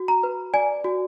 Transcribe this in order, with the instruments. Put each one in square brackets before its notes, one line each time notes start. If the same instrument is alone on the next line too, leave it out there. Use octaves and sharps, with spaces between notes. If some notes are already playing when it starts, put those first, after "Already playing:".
Already playing: [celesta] F#4
A#5
B4
D5 G#5
F#4